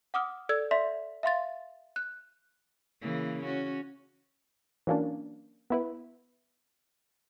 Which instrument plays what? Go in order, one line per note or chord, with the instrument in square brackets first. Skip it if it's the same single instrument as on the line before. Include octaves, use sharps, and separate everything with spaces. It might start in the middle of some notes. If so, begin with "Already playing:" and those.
[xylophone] F#5 D6 D#6 F6
A4 D5 E6 G#6
D5 E5 C6 B6
E5 F5 C6 A6
F#6
[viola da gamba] C#3 E3 A#3
C#4 F#4
[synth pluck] E3 F#3 A#3 C#4 D4
B3 E4 B4